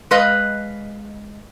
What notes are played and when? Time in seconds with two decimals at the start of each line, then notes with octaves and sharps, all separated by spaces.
0.11 G#3 B4 D#5 F5